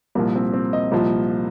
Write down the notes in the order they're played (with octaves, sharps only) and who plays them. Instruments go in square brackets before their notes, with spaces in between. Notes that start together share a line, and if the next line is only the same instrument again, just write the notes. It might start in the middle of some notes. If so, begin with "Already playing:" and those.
[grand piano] C2 A#2 F3 A#3
C4
C4
D#5
C2 A#2 F3